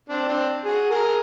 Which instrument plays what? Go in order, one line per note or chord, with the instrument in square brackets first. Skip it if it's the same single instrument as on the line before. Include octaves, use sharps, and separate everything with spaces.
[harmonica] C4 D4
C4 D4
F#4 G#4
G#4 A#4
G#4